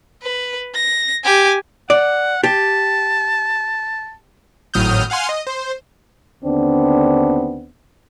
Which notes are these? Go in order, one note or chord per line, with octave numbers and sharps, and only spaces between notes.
B4
A#6
G4 G#5
D5 F#5
G4 A5
G#1 A2 F#3 D#6 F6 G6
F5 F#5 G#5 C6 F6
D#5
C5
D#2 D3 B3 C4 D4